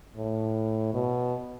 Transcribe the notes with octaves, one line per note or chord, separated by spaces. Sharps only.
A2
B2